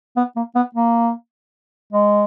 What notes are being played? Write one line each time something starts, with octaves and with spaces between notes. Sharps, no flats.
B3
A#3
B3
A#3
G#3